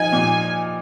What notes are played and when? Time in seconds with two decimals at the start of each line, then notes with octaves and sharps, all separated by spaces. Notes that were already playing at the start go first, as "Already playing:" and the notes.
Already playing: F3 D#4 G#5
0.13 A#2